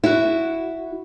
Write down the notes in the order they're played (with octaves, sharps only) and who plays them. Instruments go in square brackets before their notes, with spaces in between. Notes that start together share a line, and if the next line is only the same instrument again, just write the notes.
[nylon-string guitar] E4 F#4